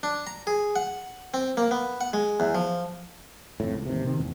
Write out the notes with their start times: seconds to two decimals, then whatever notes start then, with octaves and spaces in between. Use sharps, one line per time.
0.03 D4
0.27 A#5
0.47 G#4
0.76 F#5
1.34 C4
1.57 A#3
1.71 B3
2.01 F#5
2.13 G#3
2.40 E2
2.55 F3
3.60 F2 A2
3.74 C#2
3.86 A1 D#2 C3
4.04 C3 D#3 C4
4.19 A1 E2 A#2